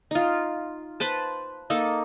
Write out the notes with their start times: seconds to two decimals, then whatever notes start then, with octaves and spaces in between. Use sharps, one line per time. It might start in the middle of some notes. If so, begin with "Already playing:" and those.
0.11 D#4 F4
1.00 B4 C5 A5
1.70 A#3 D#4 A4